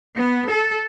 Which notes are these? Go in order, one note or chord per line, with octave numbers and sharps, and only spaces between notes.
B3
A4